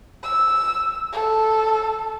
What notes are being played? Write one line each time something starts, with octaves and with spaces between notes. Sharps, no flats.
E6
A4